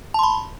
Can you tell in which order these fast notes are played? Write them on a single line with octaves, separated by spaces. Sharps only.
A5 C6 B5